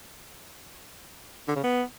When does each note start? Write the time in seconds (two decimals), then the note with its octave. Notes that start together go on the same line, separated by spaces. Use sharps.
1.48 D3
1.56 C#3
1.64 B3